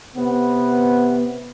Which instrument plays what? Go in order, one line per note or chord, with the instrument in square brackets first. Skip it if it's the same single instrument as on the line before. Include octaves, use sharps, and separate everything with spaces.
[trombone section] C3 B3